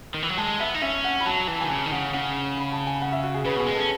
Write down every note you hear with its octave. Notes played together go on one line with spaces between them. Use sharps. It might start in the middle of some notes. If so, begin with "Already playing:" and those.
D#3
E3
F#3
G#3 A5
B3 E5
D#4
C#4 E5
F#5
B5
F#3 A5
E3 A5
D#3 G#5
C#3 A5
D#3
C#3 F#5
C#3 F#5
B5
A5
G#5
F#5
E5
F#4
G#4
C#3 B4
B2 G#4
G#3
C#4 A4